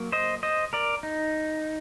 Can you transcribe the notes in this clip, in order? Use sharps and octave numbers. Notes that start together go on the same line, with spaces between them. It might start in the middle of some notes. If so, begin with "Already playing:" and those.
Already playing: F#3 A#3
C5 D#5
C5 D#5
A#4 D5
D#4